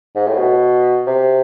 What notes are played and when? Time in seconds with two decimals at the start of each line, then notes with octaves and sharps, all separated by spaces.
0.16 G#2
0.27 A2
0.38 B2
1.07 C3